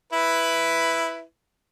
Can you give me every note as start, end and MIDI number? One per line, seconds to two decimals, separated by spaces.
0.13 1.23 64
0.13 1.23 71